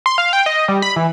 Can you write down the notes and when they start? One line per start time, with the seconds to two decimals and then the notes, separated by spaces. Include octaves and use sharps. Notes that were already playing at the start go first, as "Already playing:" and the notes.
0.06 C6
0.18 F5
0.33 G5
0.46 D#5
0.68 G3
0.82 B5
0.96 E3